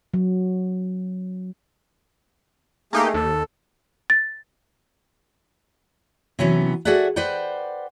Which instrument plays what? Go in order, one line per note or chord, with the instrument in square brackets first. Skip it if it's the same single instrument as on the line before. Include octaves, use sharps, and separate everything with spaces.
[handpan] F#3
[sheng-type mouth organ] A3 G#4 [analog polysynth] A#3 D#4 G4
[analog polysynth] D#2 [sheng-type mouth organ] A4
[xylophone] A6
[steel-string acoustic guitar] C3 E3 F#3 B3 C#4
F#4 G#4 A4 D5 E5 F#5
B4 C5 D5 F#5 G5